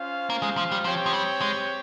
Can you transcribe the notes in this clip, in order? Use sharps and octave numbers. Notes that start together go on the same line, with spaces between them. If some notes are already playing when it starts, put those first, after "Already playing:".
Already playing: C#4 F4 C5 F5
A#3
G#3
F3
G3
F3 C4 G4 C#5 G5
F3
G3
G#3